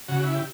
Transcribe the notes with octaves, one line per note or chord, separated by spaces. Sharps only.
C#3 F#4
E4
G4